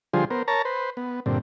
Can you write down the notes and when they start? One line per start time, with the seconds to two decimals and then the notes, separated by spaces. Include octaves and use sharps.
0.14 D3 F3 G3 F4 G#4 C5
0.31 B3 A#4 C5
0.48 A#4 C#5 A5 A#5
0.65 B4 C5
0.97 B3
1.26 G2 A#2 D3 C4